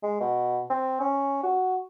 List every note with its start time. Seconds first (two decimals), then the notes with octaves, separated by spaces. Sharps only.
0.03 G#3
0.20 B2
0.70 C4
1.00 C#4
1.43 F#4